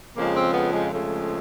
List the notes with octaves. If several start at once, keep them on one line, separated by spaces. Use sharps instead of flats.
F2 C#3 F3 G#3 A#3
C4
B3
G#3
F2 C#3 F3 G#3 A3